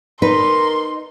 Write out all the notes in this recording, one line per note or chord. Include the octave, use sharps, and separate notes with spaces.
D#4 A#4 B4 C6